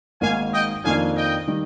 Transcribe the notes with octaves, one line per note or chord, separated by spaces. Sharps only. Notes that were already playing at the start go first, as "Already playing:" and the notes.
G#1 G#2 D#3 A#3 F5 G#5
D#5 G5
F2 D#3 A#3 D4 F5 G#5
D#5 G5
D#3 G3